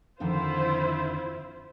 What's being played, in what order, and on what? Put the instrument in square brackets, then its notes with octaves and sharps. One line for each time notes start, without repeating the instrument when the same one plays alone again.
[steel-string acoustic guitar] F2 D3 D#3 [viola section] E4 F4 C5